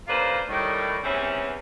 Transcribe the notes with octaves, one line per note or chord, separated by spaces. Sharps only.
C#3 A#3 D4 F4 B4 C5
A2 D#3 G3
E2 G2 E3 C4 C#4